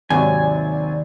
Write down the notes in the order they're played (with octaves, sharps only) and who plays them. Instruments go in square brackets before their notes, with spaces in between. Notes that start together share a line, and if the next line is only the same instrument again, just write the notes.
[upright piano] G#1 C3 F#3 [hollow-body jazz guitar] D#2 [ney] D5 [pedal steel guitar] G#5